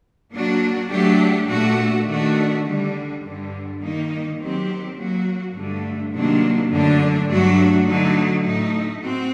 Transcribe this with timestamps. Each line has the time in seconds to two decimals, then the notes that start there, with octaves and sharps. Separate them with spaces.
0.33 F#3 A#3 D4 F#4
0.91 F#3 A3 D4 G4
1.48 A#2 A3 D4 F#4
2.07 D#3 A3 D4 F#4
2.65 D3 G3 D4
3.23 G2 D3 G3
3.81 D#3 G3 A#3 D#4
4.38 D#3 F#3 C4 G4
4.96 F#3 A#3 F#4
5.55 G2 D3 A3
6.13 C3 D#3 F#3 A#3 D4
6.71 F#2 D3 A3 D4
7.28 G2 F#3 A3 D4 F#4
7.87 D3 F#3 A3 D#4
8.45 A2 A3 D#4
9.03 C4 F#4